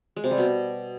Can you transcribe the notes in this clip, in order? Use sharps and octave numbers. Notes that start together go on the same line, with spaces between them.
G#3
C3
G3
B2